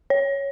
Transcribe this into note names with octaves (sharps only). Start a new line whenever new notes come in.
C#5